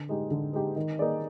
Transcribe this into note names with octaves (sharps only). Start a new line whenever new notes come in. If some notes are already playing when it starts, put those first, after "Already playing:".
Already playing: D3
G#3 D#4 G4
D3
G#3 D#4 G4
D#3
A#3 D#4 G#4 D5